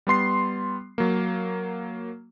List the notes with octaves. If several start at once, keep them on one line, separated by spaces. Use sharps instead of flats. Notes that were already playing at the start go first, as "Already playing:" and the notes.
G3 B3 C6 C7
F#3 A#3